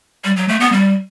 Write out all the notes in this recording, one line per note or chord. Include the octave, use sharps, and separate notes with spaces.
G3
F#3
A3
B3
G3